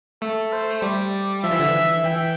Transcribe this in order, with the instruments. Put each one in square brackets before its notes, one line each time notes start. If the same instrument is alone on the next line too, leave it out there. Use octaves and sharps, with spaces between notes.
[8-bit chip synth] A3 [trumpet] A4
[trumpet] C5
[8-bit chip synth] G3 [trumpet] D5
[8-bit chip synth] F3 [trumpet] E5
[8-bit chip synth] E3
D3
E3
[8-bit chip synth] E3 [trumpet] G5